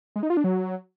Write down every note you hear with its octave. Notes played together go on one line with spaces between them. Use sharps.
G#3
D#4
F4
D4
F#3